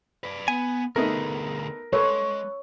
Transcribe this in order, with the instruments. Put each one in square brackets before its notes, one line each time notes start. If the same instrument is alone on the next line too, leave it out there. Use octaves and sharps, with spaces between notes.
[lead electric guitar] B4 D5
[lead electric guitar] B3 [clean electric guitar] G#5
[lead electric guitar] D2 G#4 [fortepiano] A3 B3 D#4 [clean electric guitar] A#4
[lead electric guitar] G#3 [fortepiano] A4 B4 [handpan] C#5